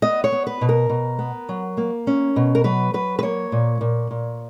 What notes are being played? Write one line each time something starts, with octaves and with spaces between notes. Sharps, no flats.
B3 D#5
C#5
B3
B4
B2
A#4
B2
B3
F#3
A#3
C#4
B2
A#4
F#3 B4
F#3 B4
B4
A#3 C#5
A#2
A#2
A#2